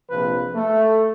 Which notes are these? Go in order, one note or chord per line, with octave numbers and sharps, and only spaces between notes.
A#1 C3 F3 B4
A3